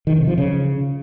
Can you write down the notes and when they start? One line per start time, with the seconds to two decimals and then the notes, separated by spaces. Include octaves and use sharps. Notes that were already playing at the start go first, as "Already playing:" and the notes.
0.07 D#3
0.17 C3
0.27 F3
0.38 C#3